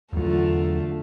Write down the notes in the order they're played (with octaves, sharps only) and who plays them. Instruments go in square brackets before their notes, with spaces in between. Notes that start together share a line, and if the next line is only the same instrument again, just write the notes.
[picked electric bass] E2 F#3 [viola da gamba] D3 A3 F4